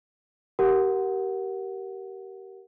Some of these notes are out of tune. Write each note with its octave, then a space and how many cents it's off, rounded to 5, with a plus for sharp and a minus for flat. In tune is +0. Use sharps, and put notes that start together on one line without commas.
G4 -25 A#4 +0 F#5 +0